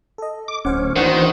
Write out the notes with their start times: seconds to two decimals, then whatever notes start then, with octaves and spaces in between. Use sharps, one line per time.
0.18 A4 D#5
0.48 D6
0.65 D1 C#4 C5 F#5 D6
0.96 D#3 E3 A#3 D4 F#4 C5 F#5